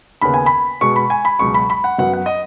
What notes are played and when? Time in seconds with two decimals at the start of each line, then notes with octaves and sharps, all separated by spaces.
0.21 D#2 C#3 B3 B5
0.34 G#5
0.46 B5
0.81 B2 G#3 B3 C#6
0.96 B5
1.10 G#5
1.25 B5
1.39 C#2 B2 F#3 C#6
1.54 B5
1.70 B5
1.84 F#5
1.98 F#2 F#3 B3 F#5
2.13 F#5
2.26 D#5